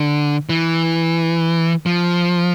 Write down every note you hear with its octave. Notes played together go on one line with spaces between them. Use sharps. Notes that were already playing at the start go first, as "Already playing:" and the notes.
Already playing: D3
E3
F3